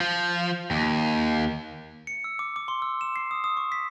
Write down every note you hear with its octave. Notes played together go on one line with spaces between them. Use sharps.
F3
D#2
C#7
E6
D6
D6
C6
E6
E7
C7
D#6
D#6
C#6
B6